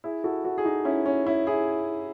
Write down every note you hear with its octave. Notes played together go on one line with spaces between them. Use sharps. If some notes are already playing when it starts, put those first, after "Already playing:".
E4 G#4
F#4 A4
F#4 A4
G#4
D#4 F#4
C#4 E4
C#4
C#4 E4
E4 G#4